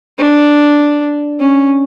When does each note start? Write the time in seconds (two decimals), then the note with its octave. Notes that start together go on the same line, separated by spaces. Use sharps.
0.18 D4
1.40 C#4